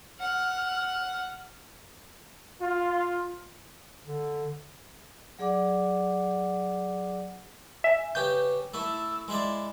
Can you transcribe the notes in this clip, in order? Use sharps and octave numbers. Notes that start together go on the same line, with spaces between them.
F#5 F6
F4
D3
F#3 G#4 D5 F#5 D6
E5 G#5
C#3 G4 B4 G6
A3 E4 E6
G#3 E4 D5 C6